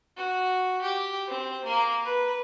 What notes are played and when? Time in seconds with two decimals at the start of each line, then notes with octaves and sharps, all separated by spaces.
0.17 F#4
0.82 G4
1.28 C4
1.65 A#3
2.05 B4